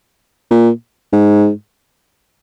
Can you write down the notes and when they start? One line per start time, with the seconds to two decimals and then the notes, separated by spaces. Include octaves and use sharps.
0.51 A#2
1.13 G#2